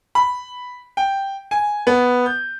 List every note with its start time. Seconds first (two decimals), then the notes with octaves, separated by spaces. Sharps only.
0.15 B5
0.97 G5
1.51 G#5
1.87 B3
2.26 G6